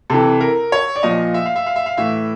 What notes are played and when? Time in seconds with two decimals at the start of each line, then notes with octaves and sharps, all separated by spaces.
0.10 C3 E3 A4
0.41 A#4
0.72 C#5
0.96 D5
1.03 A#2 F3 D#5
1.34 E5
1.46 F5
1.56 E5
1.66 F5
1.76 E5
1.86 F5
1.97 A2 E3 E5